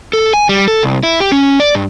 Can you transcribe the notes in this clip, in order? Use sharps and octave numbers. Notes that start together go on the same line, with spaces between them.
A4
G#5
G3
A4
C2
E4
G4
C#4
D5
G2